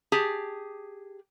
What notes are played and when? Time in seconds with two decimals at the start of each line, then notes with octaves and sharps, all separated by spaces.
0.12 G4 G#4 A5